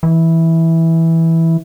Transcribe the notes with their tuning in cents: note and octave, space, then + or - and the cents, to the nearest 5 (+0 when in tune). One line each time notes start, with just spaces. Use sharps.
E3 -10